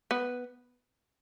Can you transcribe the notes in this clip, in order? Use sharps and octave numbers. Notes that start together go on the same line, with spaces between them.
B3